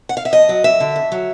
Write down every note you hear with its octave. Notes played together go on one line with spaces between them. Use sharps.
F#5
F5
E5
F2 D#5
F#3
F2 E5
D3
F2
F#3